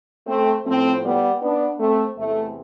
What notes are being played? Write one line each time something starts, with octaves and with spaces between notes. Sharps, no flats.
A3 C4
A2 F3 A3 C4
G3 B3
B3 D4
A3 C4
E2 C3 E3 A3